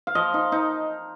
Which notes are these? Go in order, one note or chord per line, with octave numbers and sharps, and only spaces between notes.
F5
F3 D#5
D#4
D#4